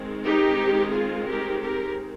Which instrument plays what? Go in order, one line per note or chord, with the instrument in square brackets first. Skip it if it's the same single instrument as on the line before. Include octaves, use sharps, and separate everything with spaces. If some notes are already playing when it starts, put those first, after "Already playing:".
Already playing: [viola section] D#3 G#3 C4
D#4 G4
F4 G#4
G4 A#4
G4 A#4